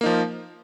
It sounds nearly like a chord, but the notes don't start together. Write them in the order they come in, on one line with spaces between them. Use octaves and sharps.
A#3 D#4 F3